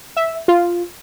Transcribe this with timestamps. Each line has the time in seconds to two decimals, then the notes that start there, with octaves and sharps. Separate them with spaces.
0.16 E5
0.48 F4